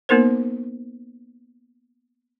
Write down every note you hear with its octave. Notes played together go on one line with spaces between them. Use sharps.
A#3 B3 D#4 A#4 C5